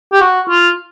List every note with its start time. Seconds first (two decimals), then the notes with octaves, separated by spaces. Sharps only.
0.12 G4
0.20 F#4
0.49 F4